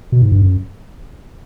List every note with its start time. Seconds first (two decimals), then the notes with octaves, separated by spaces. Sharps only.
0.12 B2
0.22 G#2
0.32 G2
0.42 F#2